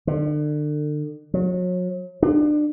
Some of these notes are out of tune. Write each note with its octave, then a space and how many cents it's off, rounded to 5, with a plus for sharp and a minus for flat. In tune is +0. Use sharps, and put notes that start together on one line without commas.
D3 +35
F#3 -35
D4 +30